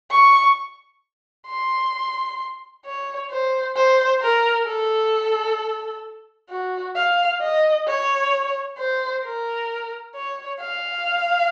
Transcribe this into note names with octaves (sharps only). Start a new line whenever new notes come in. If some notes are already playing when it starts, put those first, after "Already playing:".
C#6
C6
C#5
C5
C5
A#4
A4
F#4
F5
D#5
C#5
C5
A#4
C#5
F5